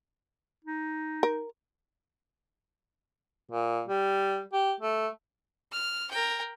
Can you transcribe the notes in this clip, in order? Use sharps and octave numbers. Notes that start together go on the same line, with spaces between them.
D#4
A#4
A#2
G3
G4
A3
F6
A#4 G5